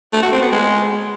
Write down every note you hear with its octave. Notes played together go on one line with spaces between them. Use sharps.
A3
F#4
C4
B3
G#3